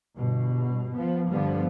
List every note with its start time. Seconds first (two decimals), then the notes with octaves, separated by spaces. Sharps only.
0.16 G1 B2
0.95 F3 B3
1.29 G2 D3 F3 B3